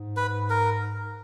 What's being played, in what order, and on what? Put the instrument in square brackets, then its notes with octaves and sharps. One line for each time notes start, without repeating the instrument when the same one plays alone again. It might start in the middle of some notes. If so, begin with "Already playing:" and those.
Already playing: [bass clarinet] G#2
[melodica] B4
A#4